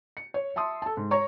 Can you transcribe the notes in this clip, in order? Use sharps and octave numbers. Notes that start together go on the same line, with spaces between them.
C#7
C#5
E5 A5 C6 D#6
A4 A5
G#2
C#5 A#5 C#6